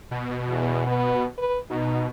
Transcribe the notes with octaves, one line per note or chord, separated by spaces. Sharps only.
B2
E2
B3
B4
B2 D#4